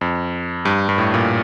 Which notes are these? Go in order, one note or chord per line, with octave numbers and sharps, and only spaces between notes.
F2
G2
G2
A2
A#2